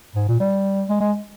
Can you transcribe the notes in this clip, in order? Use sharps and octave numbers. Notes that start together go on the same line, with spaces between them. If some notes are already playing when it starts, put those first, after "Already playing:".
G#2
A#2
G3
G#3
G#3